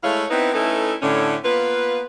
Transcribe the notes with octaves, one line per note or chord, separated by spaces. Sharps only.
G#3 A3 E4 C#5 F5
B3 C4 D#4 E4 B4
A3 C#4 D#4 E4 A4 B4
A2 D3 C#4
A#3 B3 F4 B4